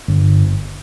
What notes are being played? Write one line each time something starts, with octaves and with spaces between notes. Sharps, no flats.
G1